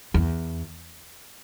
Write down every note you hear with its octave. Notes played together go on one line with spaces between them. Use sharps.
E2